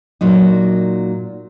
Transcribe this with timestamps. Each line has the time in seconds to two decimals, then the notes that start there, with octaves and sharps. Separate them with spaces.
0.21 A#2 F#3 D#4